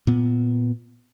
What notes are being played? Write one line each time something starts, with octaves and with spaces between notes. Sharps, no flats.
A#2 B3